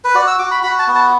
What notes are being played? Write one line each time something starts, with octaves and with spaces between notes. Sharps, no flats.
B4
F#4 D5
E6
F#4 D6
B5
F#4 B5
A5
B3
A5